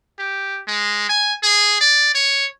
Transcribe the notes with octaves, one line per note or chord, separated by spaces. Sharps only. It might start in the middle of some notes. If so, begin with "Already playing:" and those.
G4
G#3
G#5
G#4
D5
C#5